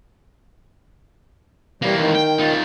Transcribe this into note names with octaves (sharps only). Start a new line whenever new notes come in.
E3 G3 A#3
D#3
G5
D#4 F4